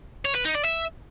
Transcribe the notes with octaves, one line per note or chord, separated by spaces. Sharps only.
C#5
B4
D#4
D5
E5